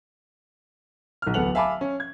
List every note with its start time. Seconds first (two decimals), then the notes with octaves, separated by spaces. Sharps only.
1.22 B1 F6
1.34 D1 B3 A4 F#5 F7 F#7
1.55 E5 F5 G#5 A5 B5 D6
1.81 C#4
2.00 G#6